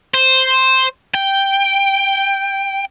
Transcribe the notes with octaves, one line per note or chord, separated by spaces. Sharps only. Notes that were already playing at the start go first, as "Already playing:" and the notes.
C5
G5